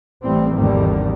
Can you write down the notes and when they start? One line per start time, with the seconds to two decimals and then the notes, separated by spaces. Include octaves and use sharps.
0.22 A1 A2 E3 G3 C4
0.55 G#1 E2 D3 D#3 G3